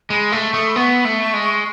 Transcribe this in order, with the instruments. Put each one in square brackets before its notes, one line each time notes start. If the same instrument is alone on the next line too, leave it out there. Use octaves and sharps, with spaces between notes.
[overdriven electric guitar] G#3 [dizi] B5
[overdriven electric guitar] A3 [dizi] C#6
[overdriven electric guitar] A3 [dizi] D#6
[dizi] B5
[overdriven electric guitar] B3 [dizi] C#6
[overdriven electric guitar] A3
G#3